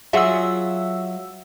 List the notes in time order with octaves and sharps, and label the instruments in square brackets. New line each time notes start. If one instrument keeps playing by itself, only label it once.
[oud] F#3 F4 G#4 [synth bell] E5 F#5 E6